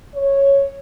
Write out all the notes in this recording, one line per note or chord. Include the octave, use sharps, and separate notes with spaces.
C#5